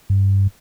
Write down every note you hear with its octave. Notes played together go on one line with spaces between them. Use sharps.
G2